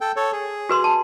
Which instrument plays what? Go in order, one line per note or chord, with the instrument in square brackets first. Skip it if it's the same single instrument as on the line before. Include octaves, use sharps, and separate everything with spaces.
[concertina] A4 G5
A4 C#5
G#4
[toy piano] F#4 B4 C6
A5